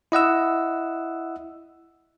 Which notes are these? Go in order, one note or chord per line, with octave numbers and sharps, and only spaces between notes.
E4 D#5 F#5 E6